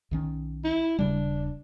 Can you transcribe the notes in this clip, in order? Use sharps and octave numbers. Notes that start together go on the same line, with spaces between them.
B1 D#3 C#4
E4
D#1 C#3 G3 D4